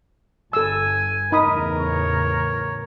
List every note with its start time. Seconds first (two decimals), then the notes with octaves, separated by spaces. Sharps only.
0.53 G1 A4 G#5 E6
1.32 E2 A2 C#3 D#4 A#4 B5 D#6
1.77 C#5